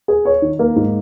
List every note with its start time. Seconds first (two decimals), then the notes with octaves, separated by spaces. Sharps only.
0.08 G#4
0.25 C#5
0.42 D#3
0.59 A#3
0.76 G#2